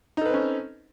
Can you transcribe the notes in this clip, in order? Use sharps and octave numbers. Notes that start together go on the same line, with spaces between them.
C4 C#4 D#4 A4 B4